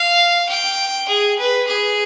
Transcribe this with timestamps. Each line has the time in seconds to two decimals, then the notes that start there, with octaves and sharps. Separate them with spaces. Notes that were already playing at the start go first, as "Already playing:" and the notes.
Already playing: F5
0.49 G5
1.08 G#4
1.39 B4
1.67 G#4